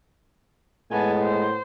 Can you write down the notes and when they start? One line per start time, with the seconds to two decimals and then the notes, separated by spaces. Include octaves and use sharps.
0.92 A2 G#3 B3 G#5 A5
1.22 C5